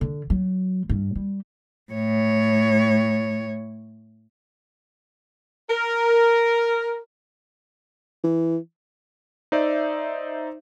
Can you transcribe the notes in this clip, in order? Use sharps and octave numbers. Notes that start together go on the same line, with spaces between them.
D3
F#3
G2
G3
A2 C#5
A#4
E3
D#4 C5 D5 E5